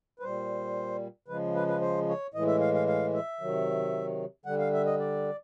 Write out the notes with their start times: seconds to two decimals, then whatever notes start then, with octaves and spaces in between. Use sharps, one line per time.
0.19 B4
0.23 A#2 G3 C5
1.28 C#3 F3 G#3 B4
1.55 B4
1.68 B4
1.81 C5
2.09 C#5
2.34 A2 E3 G#3 D#5
2.47 E5
2.61 F5
2.74 F5
2.88 F5
3.13 E5
3.41 C3 D#3 F#3
4.46 D3 G3 F#5
4.59 F5
4.73 E5
4.86 D#5
4.99 D5